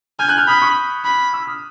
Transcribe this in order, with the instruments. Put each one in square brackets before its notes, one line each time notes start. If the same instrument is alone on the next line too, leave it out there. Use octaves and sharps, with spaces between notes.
[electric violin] G#5 [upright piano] F6 G6
[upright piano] F#6 G#6
F6 G6
[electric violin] B5 [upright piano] D#6 F6
[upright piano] C#6 D#6
[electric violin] B5
[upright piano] D6 E6
D#6 F6